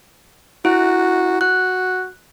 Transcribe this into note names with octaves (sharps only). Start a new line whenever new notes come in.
E4 F#4
F#4 F#6